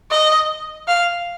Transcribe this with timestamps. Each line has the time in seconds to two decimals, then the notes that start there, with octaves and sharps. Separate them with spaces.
0.11 D#5
0.88 F5